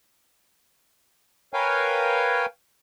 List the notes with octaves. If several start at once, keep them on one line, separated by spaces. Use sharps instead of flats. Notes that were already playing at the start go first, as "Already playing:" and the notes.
A#4 B4 C#5 F5 G5 G#5